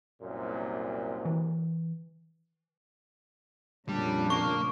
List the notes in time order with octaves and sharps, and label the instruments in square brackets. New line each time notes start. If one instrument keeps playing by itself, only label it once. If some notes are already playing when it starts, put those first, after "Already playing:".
[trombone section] C2 F#2 A#2
[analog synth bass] E3
[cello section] F2 A#2 C#3 [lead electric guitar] G3 [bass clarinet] D4
[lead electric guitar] A#3 [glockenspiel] C#6